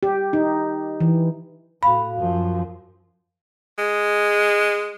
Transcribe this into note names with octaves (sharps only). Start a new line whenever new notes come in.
G4
D#4
E3
A2 F#4 F5 B5
F#2 F3
G#3